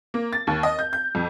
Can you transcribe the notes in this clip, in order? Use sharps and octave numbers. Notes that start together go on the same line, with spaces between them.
A#3
A6
D#2
D#5
G6
G6
F2